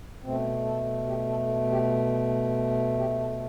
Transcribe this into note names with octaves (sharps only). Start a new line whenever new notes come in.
B2 A3 C4
A4
G4
A4
G4
G4
A4